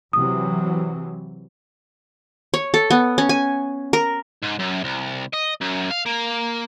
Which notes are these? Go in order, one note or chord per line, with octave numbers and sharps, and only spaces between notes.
C3 E3 F#3 D#6
C#5
A4
B3
C#4
G#5
A#4
G#2
F#2
C2
D#5
F#2
F5
A#3